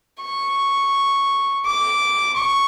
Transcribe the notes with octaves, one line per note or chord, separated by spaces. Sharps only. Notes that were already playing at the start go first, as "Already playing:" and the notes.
C#6
D6
C#6